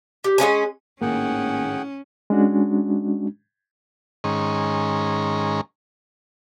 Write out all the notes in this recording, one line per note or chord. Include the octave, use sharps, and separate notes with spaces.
G4
G#3 B3 C#4 G#5
G#1 A2 D#3 A#3 C#4 G#4 F#5 G5
G#3 C#4 D4 F#4
G#2 D#3 C#4